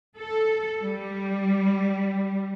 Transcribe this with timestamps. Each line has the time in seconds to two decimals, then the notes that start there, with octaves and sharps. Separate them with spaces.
0.17 A4
0.81 G3